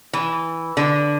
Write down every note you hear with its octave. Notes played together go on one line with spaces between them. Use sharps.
E3
D3